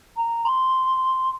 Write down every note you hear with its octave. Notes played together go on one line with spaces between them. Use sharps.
A#5
C6